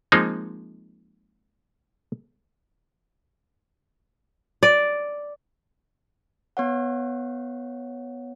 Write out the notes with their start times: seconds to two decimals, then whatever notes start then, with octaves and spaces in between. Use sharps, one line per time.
0.12 F3 G#3 A#3 C4 D#4
4.63 D5
6.57 B3 C#5 F#5